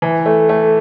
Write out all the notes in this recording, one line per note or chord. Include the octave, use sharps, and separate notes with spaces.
E3
A3
A3